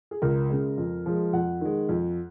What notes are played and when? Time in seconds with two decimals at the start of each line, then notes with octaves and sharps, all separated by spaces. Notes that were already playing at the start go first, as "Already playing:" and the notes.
0.11 G#4
0.22 C#2 A#4
0.50 C#3 G#3
0.78 F2
1.06 F3 G#3
1.33 F2 F#5
1.61 D#3 G#3
1.89 F2